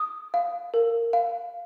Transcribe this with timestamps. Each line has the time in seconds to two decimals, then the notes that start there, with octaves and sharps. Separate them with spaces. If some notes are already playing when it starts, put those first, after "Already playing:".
Already playing: D#6
0.34 F5
0.74 A#4
1.13 F5